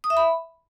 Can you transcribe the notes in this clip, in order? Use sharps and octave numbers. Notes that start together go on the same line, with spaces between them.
D#6
E5
B5